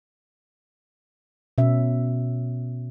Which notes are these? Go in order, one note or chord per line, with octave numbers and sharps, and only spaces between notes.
B2 C#4 E5